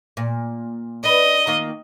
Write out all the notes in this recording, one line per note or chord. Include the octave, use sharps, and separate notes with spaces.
A#2
D4 B4 D#5
D#3 A#3 F4